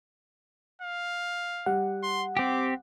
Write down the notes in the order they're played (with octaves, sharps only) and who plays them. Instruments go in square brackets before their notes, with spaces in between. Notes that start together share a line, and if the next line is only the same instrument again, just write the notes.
[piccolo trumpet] F5
[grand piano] G3 [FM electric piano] F#5
[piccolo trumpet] C6
[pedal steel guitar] C4 G4 [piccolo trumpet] D6